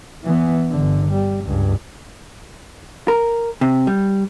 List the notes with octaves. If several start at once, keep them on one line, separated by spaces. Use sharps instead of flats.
E3 B3
G1 D3
G3
C#2 G2
A#4
C3
G3